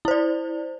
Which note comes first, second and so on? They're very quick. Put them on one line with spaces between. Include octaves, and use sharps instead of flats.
E4 C5 D5